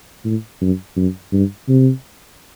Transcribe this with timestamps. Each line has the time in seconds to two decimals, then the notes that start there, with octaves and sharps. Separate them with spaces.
0.25 A2
0.61 F#2
0.97 F#2
1.33 G2
1.69 C3